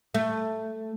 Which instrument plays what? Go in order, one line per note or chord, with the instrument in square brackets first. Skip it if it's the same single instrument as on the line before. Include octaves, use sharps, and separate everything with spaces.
[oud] A3